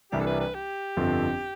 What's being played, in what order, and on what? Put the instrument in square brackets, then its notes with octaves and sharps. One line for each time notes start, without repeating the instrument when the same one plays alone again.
[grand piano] C2 C3 E3 G3 D4 [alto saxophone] G4
[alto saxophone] A4
B4
B4
G4
[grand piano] G1 F2 D3 F3 C4